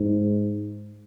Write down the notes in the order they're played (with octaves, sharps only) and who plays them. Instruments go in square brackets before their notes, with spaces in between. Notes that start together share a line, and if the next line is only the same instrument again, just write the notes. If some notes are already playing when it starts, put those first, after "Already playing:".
Already playing: [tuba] G#2